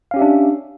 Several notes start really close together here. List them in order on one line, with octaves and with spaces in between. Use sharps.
F5 C#4 G4 E5 D4